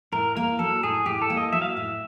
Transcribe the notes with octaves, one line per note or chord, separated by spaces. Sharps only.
A2 A#4
A#3 A#4
F#3 A4
A2 G#4
A2 G4
A4
A#3
D#5
F#3 E5
F5
E5
A2